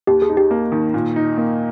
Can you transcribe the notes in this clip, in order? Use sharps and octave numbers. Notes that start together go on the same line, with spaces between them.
D#2 G4
G#4
D#4
G4
A#3
D#3
A#2
D#4
A#3